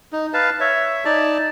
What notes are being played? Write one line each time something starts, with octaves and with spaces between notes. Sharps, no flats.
D#4
B4 F5 A5
C#5 E5
D#4 D5 A5